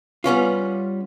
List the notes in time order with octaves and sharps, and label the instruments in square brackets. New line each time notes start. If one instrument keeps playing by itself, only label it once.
[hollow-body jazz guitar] G3 B3 C#4 F4